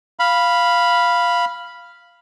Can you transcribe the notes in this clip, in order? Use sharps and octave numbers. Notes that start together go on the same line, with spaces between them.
F5 B5